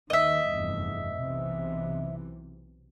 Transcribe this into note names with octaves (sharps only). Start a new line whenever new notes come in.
D#2 D#3 D#5 E5
F1 E2 G2
B1 C3 E3